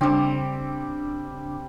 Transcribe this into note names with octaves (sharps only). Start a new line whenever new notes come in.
C#3 G3 C4 D4 D6